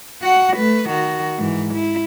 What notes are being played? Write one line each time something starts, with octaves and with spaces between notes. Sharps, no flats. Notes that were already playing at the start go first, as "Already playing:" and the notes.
F#4 F#5
A3 B4
D#3 F#4
G#2 E3
E4